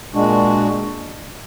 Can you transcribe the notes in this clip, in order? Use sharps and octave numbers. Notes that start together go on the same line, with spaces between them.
A#2 G#3 D4 F#4